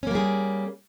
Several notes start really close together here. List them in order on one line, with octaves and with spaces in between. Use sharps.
C#4 A#3 G3 G#4